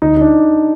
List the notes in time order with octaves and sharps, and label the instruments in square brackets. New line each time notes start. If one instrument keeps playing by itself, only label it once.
[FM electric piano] D2 [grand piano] D#4
[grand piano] D#4
D4